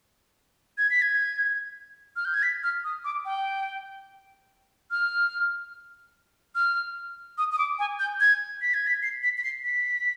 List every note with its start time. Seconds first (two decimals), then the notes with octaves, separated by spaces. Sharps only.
0.78 G#6
0.90 B6
1.02 G#6
2.16 F6
2.25 G6
2.34 G#6
2.43 B6
2.63 F6
2.84 D#6
3.04 D6
3.25 G5
4.91 F6
6.55 F6
7.38 D#6
7.52 D#6
7.58 D6
7.79 G#5
7.99 G6
8.20 G#6
8.61 B6
8.74 G#6
8.87 B6
9.03 C7
9.23 B6
9.38 B6
9.43 C7
9.64 B6